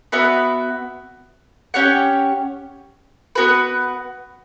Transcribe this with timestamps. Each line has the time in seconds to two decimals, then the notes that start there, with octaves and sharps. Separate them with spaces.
0.12 B3 F#4 B4 E5
1.74 C#4 G4 C#5 F#5
3.35 B3 D4 F#4 B4